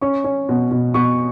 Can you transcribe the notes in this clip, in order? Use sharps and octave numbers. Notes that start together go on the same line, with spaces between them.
C#4 C#6
C#4
B2
B2
B2 C#6